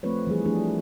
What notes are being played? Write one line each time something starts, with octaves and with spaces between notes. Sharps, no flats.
F3 A3 C4 F4 B4 C#5
E3 F3 G3 G#4
F3 A3 D4 G#4